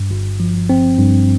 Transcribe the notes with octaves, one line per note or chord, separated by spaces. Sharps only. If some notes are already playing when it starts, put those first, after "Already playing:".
Already playing: G2
G1
F3
C4
G2